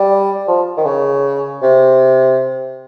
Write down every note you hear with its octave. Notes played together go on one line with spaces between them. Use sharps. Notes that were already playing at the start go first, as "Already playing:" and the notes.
Already playing: G3
F3
D#3
C#3
C3